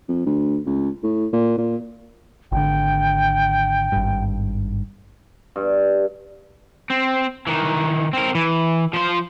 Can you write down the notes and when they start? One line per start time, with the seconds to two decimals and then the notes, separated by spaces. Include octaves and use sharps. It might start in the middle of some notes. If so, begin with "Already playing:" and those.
0.09 F2
0.26 D2
0.66 C#2
1.03 A2
1.33 A#2
1.58 A#2
2.52 G#1 D3 G5
3.92 G#1 G2
5.56 G2
6.90 C4
7.47 D#3 E3
8.13 C4 A#4
8.35 E3
8.93 F3 C5